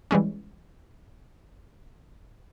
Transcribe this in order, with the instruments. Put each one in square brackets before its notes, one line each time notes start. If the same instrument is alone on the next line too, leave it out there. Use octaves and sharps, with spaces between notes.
[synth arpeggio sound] E3 G3 G#3 C#4